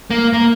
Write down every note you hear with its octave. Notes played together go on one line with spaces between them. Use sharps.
A#3
A#3